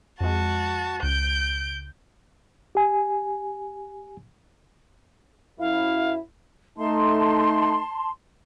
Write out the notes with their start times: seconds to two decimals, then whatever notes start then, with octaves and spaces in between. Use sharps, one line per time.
0.21 F2 G#3 F#4 A5
1.03 C#2 G6 D7
2.75 G4 G#5
5.60 F#2 E4 F5
6.78 A3 D#4 A5 C6